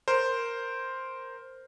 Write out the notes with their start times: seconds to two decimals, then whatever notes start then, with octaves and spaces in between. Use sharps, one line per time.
0.08 A#4 C5